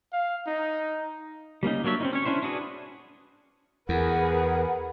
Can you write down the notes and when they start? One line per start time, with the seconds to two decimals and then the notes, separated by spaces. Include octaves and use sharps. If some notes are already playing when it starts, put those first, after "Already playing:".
0.13 F5
0.47 D#4
1.63 G3 A#3 C#4 D#4
1.84 F#3 A#3 D4 C#5 E5
2.01 C4 C#4 D#4
2.13 C#4 C#5
2.25 C#4 D4 E4 C5
2.43 D4 F#4 G#4 B4
3.89 E2 G#4 A#4 B4 F#5